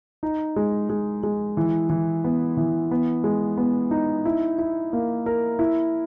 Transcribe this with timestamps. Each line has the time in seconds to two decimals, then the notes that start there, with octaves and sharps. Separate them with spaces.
0.23 D#4
0.56 G#3
0.89 G#3
1.23 G#3
1.57 E3
1.90 E3
2.24 B3
2.57 E3
2.91 B3
3.24 G#3
3.57 B3
3.91 D#4
4.25 E4
4.58 E4
4.93 A#3
5.26 A#4
5.59 E4